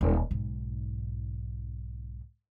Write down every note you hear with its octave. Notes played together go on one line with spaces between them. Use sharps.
D#1
B1 G#2